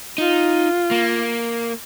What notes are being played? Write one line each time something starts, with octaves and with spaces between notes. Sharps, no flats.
D#4 F4
A#3